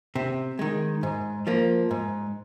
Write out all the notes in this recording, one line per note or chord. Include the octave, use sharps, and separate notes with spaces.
C3
D#3 G#3
G#2
F3 A#3
G#2